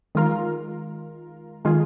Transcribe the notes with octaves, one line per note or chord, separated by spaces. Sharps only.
D#3 G#3 F4 A#4
D#3 G#3 F4 G#4